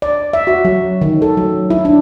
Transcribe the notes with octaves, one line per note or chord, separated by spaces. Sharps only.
D5
E5
F#4
F#3
D#3
A4
F#3
E4
D4